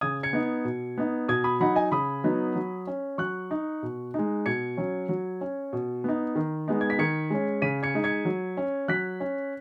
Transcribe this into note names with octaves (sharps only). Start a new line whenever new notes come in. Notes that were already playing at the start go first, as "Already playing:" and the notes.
C#3 D#6 G#6
G#6 C#7
B3 D#4
B2
B3 D#4
B2 D#6 G#6
B5 D#6
F#3 D#4 F#5 B5
D#5 G#5
C#3 B5 D#6
F#3 B3 D#4
F#3
C#4
F#3 C#6 F#6
D#4
B2
G#3 D#4
B2 G#6 C#7
F#3 C#4
F#3
C#4
B2
B3 D#4
D#3
G#3 B3 D#4
G#6
B6
D#3 G#6 C#7
G#3 C#4
C#3 B6 D#7
G#6 C#7
G#3 D#4
G#6 C#7
F#3
C#4
F#3 F#6 B6
C#4